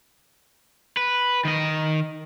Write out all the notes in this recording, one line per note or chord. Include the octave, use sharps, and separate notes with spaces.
B4
D#3 D#5